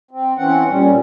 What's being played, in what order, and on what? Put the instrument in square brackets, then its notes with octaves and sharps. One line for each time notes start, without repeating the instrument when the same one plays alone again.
[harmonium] C4
E3 C4 C#4 F#5
A#2 G3 C#4